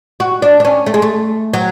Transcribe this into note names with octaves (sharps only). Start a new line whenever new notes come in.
F#4
D4
D4
C#4
A3
G#3
A3
F#3